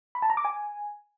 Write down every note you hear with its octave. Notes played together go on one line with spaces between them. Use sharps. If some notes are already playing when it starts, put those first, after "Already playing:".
B5
A5
A#5
D6
G#5